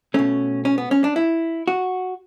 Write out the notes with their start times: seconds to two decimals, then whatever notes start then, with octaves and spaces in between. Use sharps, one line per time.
0.14 B2 A3 C#4
0.65 C#4
0.78 B3
0.91 C#4
1.04 D4
1.16 E4
1.68 F#4